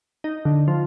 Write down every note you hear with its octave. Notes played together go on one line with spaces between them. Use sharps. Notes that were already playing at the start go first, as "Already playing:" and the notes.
D#4
D3
F3